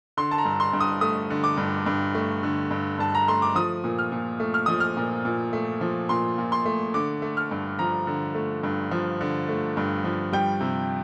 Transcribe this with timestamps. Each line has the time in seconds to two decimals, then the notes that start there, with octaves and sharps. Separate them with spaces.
0.17 D3 C6
0.31 A5
0.38 A#5
0.45 G2
0.60 C6
0.73 G2
0.80 D#6
1.01 A3 D#6
1.30 D3
1.44 D6
1.58 G2
1.86 G2
2.15 A3
2.43 D3
2.71 G2
2.99 G2 A5
3.15 A#5
3.28 A3 C6
3.42 D6
3.55 F3 D#6
3.84 A#2
3.99 F6
4.12 A#2
4.40 A3
4.54 F6
4.66 F3 D#6
4.80 F6
4.97 A#2
5.25 A#2
5.53 A3
5.81 F3
6.09 A#2 C6
6.38 A#2
6.52 C6
6.66 A3
6.94 D3 D6
7.22 A3
7.37 F6
7.51 G2
7.79 F3 A#5
8.07 D3
8.35 A3
8.63 G2
8.91 F3
9.21 D3
9.49 A3
9.77 G2
10.04 F3
10.33 G3 G5
10.60 C3